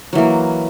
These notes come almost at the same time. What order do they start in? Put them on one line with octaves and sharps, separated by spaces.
F#3 E3 A#3